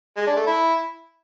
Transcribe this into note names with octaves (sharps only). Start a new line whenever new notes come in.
G#3
D4
A3
E4